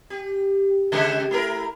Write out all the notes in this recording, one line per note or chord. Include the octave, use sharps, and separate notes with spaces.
G4
C#3 G#3 G4
A3 E4 A#4